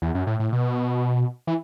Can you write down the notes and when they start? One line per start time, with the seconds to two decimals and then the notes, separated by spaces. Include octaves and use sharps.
0.02 E2
0.15 F#2
0.27 A2
0.40 A2
0.53 B2
1.47 E3